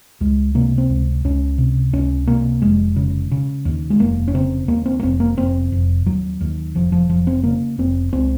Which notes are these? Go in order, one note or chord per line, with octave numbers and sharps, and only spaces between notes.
C#2 G#3
C3 A#3
C4
C#2
C#2 C#4
C3
C#2 C#4
C3 A#3
F1 G#3
C#3
C#3
D#2
G#3
F1 A#3
C#4
C#3 C4
D#2 A#3
C4
A#3
F1 C4
A#3
F1 C4
F1
D#2 F#3
D#2
F1 F3
F3
F1 F3
C4
C#3 A#3
F1 C4
C#2 C4